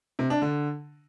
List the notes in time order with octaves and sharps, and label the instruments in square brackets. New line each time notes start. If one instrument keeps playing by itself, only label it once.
[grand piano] C3
D4
D3